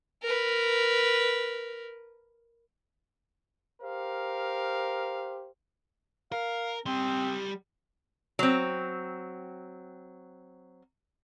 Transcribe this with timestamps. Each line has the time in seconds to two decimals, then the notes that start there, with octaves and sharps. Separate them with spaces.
0.23 A#4 B4
3.82 G4 A#4 C5 F5
6.32 A#4 F5
6.86 G3 C4 C6
8.39 F#3 C4